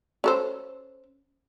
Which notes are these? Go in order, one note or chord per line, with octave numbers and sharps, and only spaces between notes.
C#4 A4 C5